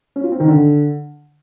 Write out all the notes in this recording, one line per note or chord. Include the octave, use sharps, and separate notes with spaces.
C#4
F4
C4
D#3
D3